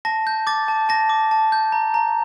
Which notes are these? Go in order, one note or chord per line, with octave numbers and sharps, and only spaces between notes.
A5 A#6
G6
D6 A6
A5
A5 A#6
D6
A5
G6
A#5
A#5